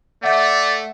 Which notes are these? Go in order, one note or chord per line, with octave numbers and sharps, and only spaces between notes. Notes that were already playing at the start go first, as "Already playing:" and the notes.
A3 D5 E5 F#5